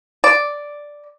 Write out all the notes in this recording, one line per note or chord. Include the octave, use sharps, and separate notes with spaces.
D5